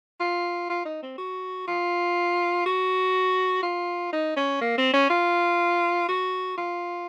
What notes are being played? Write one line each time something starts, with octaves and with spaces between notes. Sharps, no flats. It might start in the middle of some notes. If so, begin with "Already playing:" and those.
F4
F4
D#4
C4
F#4
F4
F#4
F4
D#4
C#4
A#3
C4
C#4
F4
F#4
F4